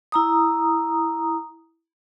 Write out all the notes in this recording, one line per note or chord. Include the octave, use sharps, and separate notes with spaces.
E4 A#5 D#6